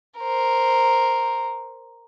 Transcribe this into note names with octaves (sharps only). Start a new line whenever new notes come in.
A#4 C5